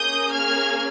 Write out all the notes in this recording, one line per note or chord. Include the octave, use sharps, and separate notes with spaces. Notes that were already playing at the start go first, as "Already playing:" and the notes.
Already playing: A#3 C#4 G#4 D#6 G6
F6 G#6